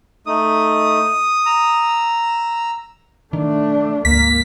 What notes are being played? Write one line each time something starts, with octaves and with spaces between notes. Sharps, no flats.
A3 D#4 D#6
A#5 E6
D#3 A3 D4
G#1 D2 A#3 B6